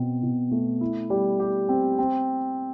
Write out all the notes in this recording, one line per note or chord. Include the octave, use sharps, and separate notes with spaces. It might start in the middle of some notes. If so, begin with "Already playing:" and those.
Already playing: B2 C4
B2
A3
E4
G3
G4
C4
C4